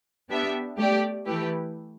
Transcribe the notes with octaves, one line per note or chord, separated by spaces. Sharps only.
B3 D4 G4 E5
A3 G4 D5
E3 A3 E4 G4 B4